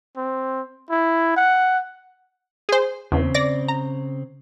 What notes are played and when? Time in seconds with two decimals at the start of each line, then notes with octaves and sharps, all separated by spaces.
0.17 C4
0.91 E4
1.37 F#5
2.69 G#4 C5
3.12 E2 C#3 C4
3.34 D5 A#6
3.68 A#5